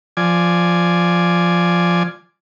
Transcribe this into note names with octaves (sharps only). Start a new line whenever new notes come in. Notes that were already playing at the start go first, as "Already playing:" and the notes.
F3 D5 G#5